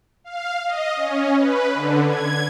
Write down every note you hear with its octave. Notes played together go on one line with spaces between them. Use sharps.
F5
D#5
C#4
B4
D3
G#6